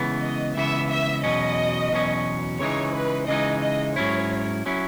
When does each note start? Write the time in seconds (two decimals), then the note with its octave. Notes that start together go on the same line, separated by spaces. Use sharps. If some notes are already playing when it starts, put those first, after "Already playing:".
Already playing: C#2 C#3 E3 B3
0.21 D#5
0.56 C#2 C#3 E3 B3 E5
0.90 E5
1.23 E2 B2 F#3 C#4 D#5
1.92 E2 B2 F#3 C#4
2.60 C#3 E3 G#3 D#4 C#5
2.94 B4
3.28 C#3 E3 G#3 D#4 D#5
3.62 D#5
3.96 G#2 F#3 C#4 E4 C#5
4.66 F#3 C#4 E4